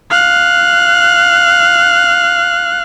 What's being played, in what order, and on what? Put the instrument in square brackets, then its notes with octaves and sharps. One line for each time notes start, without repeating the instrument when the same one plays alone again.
[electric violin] F5 F#6